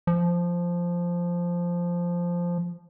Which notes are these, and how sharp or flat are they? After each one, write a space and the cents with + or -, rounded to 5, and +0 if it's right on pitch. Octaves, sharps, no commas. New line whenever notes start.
F3 -5